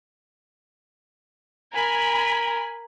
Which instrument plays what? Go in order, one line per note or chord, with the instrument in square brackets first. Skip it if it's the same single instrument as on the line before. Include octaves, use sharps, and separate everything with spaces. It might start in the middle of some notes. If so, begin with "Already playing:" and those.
[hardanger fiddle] A#4 [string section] G#5 B5